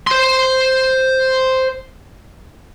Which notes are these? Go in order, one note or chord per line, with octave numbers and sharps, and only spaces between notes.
C5 C6